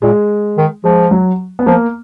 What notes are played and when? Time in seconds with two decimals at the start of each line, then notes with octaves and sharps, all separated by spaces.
0.02 A#2 G#3
0.57 D#3
0.84 F3 G#3
1.11 F#3
1.59 B3
1.66 F3 A#3